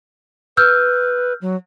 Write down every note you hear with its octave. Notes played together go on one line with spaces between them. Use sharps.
B4 E6 F6 G6
F#3